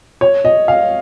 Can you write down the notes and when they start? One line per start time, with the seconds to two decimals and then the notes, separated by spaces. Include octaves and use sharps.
0.21 C#5
0.45 D#5
0.68 F5